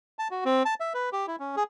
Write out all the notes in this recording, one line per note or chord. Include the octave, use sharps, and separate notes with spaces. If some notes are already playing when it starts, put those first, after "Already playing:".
A5
F#4
C4
A5
E5
B4
G4
E4
C#4
G#4